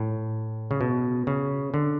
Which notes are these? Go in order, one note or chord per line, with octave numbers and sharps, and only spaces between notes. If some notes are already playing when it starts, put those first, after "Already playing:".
Already playing: A2
C#3
B2
C#3
D3